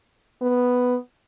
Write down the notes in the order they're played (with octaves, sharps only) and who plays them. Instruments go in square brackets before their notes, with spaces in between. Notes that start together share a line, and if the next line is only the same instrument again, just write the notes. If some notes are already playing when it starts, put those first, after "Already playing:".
[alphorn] B3